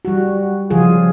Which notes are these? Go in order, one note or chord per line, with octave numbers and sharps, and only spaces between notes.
G3 F#4
C#3 F3 F4 G#4